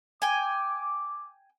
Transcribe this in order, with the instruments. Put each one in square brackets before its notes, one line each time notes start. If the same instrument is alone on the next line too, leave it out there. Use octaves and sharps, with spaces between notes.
[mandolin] G5 G#5 [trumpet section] D6